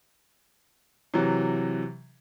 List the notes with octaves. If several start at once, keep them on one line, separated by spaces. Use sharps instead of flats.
C3 E3 F#3